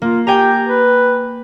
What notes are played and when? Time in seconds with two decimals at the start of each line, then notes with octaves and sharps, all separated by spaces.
0.02 A#3 F4
0.27 G4 G5 G#5 A#5
0.66 B4